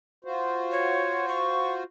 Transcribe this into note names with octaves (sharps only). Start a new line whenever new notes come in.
F4 F#4 C5
C#5
C#6